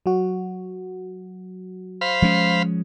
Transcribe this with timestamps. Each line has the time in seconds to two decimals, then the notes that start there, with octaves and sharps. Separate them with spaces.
0.06 F#3 F#4
2.01 C5 F5 B5
2.22 F3 G#3 C#4